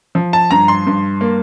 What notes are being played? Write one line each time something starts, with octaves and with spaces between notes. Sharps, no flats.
F3
A5
G2 A#5
C6
G2
A#3